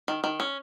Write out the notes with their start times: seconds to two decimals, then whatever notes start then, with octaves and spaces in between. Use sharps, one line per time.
0.08 D#3
0.24 D#3
0.40 C#4